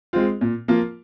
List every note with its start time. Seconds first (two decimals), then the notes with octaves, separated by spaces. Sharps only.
0.13 G#3 C4 F4
0.41 A#2
0.68 F3 A#3 F4